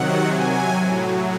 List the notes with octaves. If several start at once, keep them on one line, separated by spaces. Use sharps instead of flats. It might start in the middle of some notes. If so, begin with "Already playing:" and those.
Already playing: C3 D#3 F#3 F#5
C3 F#3 G#5
A2 F#3